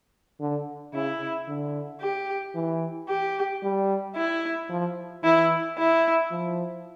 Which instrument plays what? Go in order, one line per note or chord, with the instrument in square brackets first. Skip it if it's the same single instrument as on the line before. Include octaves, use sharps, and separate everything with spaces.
[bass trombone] D3
[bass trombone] C#3 [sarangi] E4
[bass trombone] D3
[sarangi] G4
[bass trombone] E3
[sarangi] G4
[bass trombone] G3
[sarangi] E4
[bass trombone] F3
[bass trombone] E3 [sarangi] E4
[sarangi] E4
[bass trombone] F3